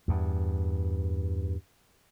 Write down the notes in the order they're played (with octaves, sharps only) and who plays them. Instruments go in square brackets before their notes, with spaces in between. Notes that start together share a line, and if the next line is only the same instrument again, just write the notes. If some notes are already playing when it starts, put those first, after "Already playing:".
[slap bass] E2 G2